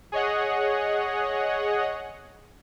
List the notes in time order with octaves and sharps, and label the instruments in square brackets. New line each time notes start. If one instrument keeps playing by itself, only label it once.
[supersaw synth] G#4 C#5 D#5 F#5